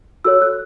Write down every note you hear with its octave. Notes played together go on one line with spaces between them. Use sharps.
F#4 A4 C#5 E6
F#6